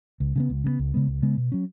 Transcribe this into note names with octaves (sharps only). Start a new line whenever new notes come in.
C#2
C#3 G#3 B3
C#2
C#3 G#3 B3
C#2
C#3 G#3 B3
C#2
C#3 G#3 B3
B2
F#3 C#4